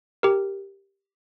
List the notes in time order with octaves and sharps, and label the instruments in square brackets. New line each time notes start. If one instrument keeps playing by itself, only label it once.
[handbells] G4 A#4